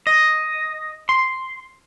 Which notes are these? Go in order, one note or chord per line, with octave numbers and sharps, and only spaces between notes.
D#5
C6